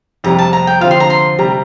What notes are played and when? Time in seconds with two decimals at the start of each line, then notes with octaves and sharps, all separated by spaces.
0.24 F2 C3 G3 A#5
0.39 A5
0.53 A#5
0.67 G5
0.81 D3 F3 C4 F4 F5
0.91 C6
1.00 A#5
1.10 C6
1.39 C3 G3 A#5